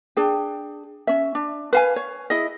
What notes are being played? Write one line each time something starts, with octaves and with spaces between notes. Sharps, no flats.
D4 G#4 G5
C#4 E5
D4
B4 F5 G#5
C#5
E4 G#4 D#5